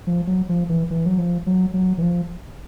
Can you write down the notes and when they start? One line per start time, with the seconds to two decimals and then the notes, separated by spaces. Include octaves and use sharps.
0.07 F3
0.27 F#3
0.49 F3
0.69 E3
0.91 E3
1.06 F#3
1.18 F3
1.46 F#3
1.74 F#3
1.98 E3
2.02 F3